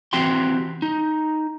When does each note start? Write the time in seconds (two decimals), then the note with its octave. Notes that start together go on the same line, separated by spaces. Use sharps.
0.13 E3 C4 F#4 G4 G5 C6
0.82 D#4